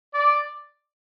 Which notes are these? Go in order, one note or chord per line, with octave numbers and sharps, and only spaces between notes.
D5